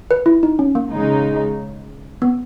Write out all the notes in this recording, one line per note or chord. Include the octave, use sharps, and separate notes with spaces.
B4
E4
D#4
C#4
A#3
C#3 G#3 D#4
B3